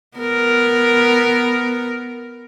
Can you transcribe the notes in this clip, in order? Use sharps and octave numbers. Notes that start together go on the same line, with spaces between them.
B3 A#4